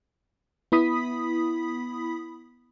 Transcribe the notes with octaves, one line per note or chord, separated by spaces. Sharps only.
B3 E4 B5 D#6 B6